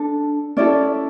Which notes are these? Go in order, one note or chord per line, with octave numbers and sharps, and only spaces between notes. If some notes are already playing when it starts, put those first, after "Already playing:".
Already playing: D4 A4
C#4 E4 A4 D5